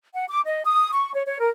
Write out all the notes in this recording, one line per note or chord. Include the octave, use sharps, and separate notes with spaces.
F#5
D6
D#5
D#6
C#6
C#5
C#5
A#4